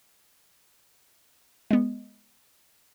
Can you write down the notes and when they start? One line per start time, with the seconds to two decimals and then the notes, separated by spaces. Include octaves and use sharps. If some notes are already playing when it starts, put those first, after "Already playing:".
1.71 G#3 B3